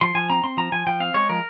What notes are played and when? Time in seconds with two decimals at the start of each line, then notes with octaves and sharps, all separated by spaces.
0.01 F3 C6
0.15 F3 G#5
0.30 C4 A#5
0.44 C4 C6
0.57 F3 A#5
0.72 F3 G#5
0.87 F3 G5
1.00 C4 F5
1.14 G#3 C#5
1.29 F3 A#4